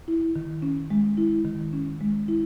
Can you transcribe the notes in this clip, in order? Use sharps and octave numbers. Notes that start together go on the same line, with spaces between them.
E4
D#3
C#4
G#3
E4
D#3
C#4
G#3
E4